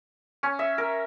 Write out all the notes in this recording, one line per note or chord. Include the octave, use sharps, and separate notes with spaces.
C#4
E5
A#4